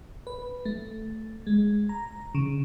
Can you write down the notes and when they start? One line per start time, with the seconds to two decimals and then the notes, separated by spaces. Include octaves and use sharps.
0.27 B4
0.65 A3
1.47 G#3
1.89 A#5
2.35 C#3